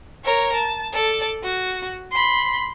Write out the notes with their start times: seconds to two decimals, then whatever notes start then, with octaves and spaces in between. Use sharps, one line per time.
0.24 A#4 C#5
0.54 A5
0.93 A4 D5
1.43 F#4
2.11 B5 C6